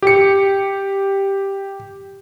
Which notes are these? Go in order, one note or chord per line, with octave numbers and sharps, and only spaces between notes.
G4 C#7